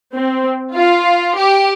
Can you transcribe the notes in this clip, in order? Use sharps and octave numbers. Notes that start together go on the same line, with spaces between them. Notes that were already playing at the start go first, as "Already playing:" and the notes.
C4
F4
G4